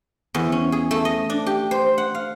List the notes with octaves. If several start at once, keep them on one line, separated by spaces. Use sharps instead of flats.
E2
C#4
G#4
A3
D#5
D4
G4
C5
F#5
F5